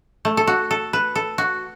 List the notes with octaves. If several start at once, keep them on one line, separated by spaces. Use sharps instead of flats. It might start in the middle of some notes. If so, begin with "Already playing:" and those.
A3
A4
F#4
A4
B4
A4
F#4